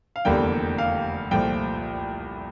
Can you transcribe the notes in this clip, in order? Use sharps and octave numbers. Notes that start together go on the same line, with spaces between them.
F5
F1 E2 D3 G3 A#3 G5
F5
C2 A#2 F3 A3 G5